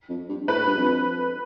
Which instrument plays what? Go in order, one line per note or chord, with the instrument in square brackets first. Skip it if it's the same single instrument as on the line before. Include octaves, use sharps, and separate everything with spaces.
[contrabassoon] F2
G2
[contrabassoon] A2 [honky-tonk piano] B4
[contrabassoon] G2
F2